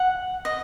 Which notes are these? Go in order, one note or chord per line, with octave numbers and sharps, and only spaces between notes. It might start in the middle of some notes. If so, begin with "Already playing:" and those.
Already playing: F#5
D#5